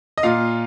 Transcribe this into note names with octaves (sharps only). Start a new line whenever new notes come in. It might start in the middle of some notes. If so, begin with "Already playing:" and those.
D#5
A#2 F4 F5